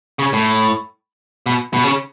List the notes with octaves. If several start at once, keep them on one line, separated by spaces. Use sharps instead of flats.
C#3
A2
B2
B2
C#3